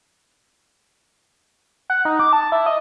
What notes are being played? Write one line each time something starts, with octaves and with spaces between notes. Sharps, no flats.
F#5
D#4
D6
A5
E4
D#5